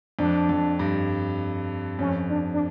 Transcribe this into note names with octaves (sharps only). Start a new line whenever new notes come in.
F2 D4
F2
G2
F2 C#4
D4
D4